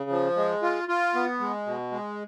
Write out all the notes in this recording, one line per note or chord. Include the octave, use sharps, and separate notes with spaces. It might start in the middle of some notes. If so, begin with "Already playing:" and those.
Already playing: C#3
F3
G#3
F4
F4
B3
G#3
B2
G#3